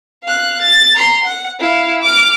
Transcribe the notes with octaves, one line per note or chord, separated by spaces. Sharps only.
F5 F#6
A6
A#5 C6
F#5
E4 F5
D6 F6